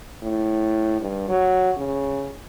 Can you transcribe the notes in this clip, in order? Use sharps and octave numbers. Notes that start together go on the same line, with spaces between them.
A2
G2
F#3
C#3